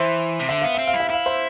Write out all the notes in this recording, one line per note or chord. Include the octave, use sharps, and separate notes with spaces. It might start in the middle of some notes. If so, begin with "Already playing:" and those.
Already playing: E3 C5 E5
C3
D3 E5
B3 F5
C4 E5
F5
E4
E5
E4 F5
C5 E5